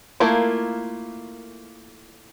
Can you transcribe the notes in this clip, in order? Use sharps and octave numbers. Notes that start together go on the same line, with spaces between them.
A3 A#3 E4 F4 A#4